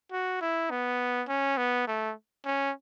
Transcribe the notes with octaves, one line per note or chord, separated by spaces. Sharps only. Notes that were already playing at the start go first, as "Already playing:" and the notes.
F#4
E4
B3
C#4
B3
A3
C#4